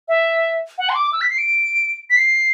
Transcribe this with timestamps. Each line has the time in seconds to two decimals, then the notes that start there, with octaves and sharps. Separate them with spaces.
0.08 E5
0.78 F#5
0.89 C6
0.95 D6
1.13 E6
1.21 B6
1.30 C7
1.38 D7
2.10 B6
2.17 C7